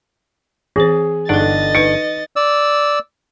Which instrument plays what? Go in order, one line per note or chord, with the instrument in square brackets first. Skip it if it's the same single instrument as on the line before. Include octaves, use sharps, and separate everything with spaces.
[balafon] E3 C4 C5 [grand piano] G#4
[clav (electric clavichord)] G1 D4 F#5 [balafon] D#4 A4 [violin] D#5 A6
[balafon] D#4 B4 [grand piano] C#7
[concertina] D5 E6